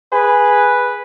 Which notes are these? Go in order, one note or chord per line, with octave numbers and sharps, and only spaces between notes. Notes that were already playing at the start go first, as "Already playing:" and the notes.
G#4 B4